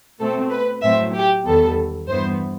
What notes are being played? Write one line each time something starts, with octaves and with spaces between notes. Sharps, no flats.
B2 A3 C4 A4
B4
A2 F#3 A3 C4 E5
G4
E2 D#3 G3 B3 A4
G2 E3 B3 C5